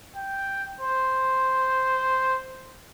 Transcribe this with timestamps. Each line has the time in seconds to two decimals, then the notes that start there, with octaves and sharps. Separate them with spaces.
0.16 G5
0.81 C5